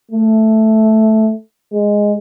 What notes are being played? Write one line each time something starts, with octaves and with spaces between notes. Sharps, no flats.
A3
G#3